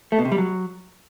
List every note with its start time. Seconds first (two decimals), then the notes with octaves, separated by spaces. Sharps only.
0.12 A3
0.19 B2
0.25 C3
0.32 G3
0.38 F#3